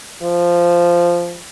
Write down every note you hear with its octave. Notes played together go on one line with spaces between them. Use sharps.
F3